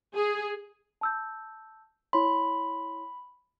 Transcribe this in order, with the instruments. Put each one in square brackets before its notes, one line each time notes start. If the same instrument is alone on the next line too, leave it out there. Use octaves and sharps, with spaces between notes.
[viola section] G#4
[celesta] A5 E6 G6
[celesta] E4 C#5 C6 [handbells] B5